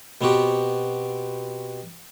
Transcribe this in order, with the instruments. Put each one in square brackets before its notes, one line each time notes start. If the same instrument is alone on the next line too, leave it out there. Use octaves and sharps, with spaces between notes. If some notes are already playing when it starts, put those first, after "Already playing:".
[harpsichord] B2 B3 C4 F#4 G4